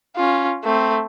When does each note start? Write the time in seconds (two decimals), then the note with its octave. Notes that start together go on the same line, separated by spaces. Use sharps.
0.16 C#4 F4
0.64 A3 C4